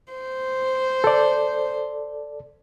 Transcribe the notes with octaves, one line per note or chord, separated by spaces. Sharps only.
C5
A4 D5